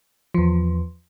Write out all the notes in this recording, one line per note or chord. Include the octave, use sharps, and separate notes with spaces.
E2 F3